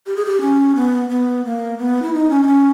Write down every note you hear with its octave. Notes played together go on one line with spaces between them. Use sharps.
G4
G#4
G4
C#4
B3
B3
A#3
B3
E4
D#4
C#4
D#4
C#4